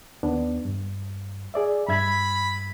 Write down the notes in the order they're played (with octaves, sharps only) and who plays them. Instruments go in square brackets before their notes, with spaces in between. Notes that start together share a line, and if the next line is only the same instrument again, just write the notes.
[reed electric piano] D#2 B3 D4
G2
G#4 D5 E5
[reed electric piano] G2 E5 G#6 [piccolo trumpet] B5